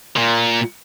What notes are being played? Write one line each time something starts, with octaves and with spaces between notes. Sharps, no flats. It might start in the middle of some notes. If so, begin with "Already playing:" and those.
A#2